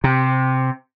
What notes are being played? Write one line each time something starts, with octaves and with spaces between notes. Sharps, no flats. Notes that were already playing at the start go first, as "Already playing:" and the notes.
C3